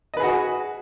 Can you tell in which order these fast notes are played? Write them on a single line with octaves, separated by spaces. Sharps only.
D#5 B4 G#4 F#4